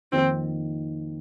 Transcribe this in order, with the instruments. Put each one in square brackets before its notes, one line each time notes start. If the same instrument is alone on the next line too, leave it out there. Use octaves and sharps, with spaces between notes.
[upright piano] F2 D#3 A#3 D#4 [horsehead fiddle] C4